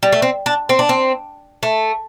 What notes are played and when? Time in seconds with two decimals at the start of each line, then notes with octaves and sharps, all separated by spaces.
0.03 G3
0.12 A3
0.22 C4
0.46 D4
0.69 C4
0.79 D4
0.89 C4
1.63 A3